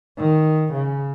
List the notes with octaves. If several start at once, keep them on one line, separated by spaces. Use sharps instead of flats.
D#3
C#3